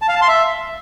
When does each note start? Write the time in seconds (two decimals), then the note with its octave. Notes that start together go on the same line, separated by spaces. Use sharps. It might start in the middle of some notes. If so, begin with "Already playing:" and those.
0.02 A5
0.08 F5
0.15 A5
0.21 C6
0.28 E5